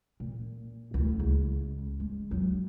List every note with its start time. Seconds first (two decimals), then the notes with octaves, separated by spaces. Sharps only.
0.20 A#2
0.94 D2 E4
1.20 C#2
2.00 G#3
2.31 F#3 G#3